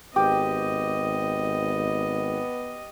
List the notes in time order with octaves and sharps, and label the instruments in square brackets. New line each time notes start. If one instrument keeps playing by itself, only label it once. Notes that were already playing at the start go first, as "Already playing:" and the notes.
[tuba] G#1 [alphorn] B3 [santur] G4 [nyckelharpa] D#5